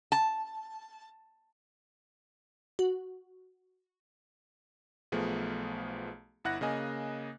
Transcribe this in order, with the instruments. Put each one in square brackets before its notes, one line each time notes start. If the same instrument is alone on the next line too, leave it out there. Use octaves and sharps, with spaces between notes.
[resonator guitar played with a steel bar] A5
[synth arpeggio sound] F#4
[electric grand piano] B1 F3 A3 B3 G#4
G1 E4 F#5 F#6 A#6
C#3 A#3 D#5 G#5